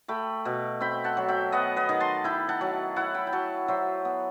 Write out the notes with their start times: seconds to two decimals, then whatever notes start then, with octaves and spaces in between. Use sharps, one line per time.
0.08 A3 G5 B5
0.45 B2
0.81 C4 G5 B5
1.04 F#5 A5
1.17 F#3
1.28 E5 G5
1.52 B3 D#5 F#5
1.76 B4 D#5
1.89 D#3
2.00 A5 C6
2.24 E4 G5 B5
2.49 F#5 A5
2.61 F#3
2.96 E4 F#5 A5
3.14 G5 B5
3.27 G5
3.33 F#3 F#5 A5
3.68 F#3 C5 E5
4.05 B3